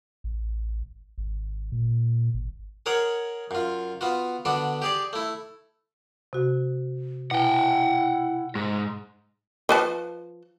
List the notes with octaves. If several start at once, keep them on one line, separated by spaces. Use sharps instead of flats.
A1
G#1
A#2
G#1
G#4 A#4 C#5 F#5
F#2 F4
B3 F4 F#4
D3 B3 D4 F#4
G4 G#4 D5
A3 E4
C3 F#4
B2 E4 F#5 G5
G#2
F3 B4 A5